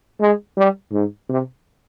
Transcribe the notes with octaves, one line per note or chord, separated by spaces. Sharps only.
G#3
G3
G#2
C3